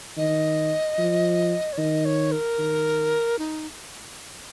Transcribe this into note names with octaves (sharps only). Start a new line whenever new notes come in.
D#3 D#5
F3
C#5
D#3 D#5
C#5
A#4
D#3
D#4